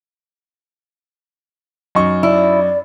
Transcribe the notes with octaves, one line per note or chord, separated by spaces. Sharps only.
F#2 D#4 C#6
E4 D5